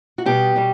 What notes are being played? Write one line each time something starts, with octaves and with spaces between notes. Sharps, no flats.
F#4
B2 G3 B3 G4
B2 G3